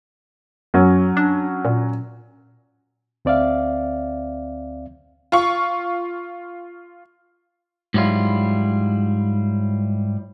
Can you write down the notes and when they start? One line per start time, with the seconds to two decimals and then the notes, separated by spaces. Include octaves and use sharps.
0.74 F#2 F#3 C#4
1.17 D4
1.65 A#2
3.25 D2 C4 D5 E5 F5
5.32 F4 C#6
7.94 G#2 F#3 G3 E4 F4